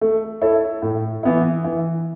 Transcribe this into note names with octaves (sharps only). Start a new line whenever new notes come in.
A3
E4 A4 C#5
A2
E3 B3 E4
E3